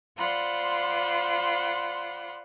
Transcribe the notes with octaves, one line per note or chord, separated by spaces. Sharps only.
F4 C5 D5 F#5 B5 C6